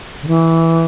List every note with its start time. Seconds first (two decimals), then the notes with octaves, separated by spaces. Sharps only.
0.23 D3
0.28 E3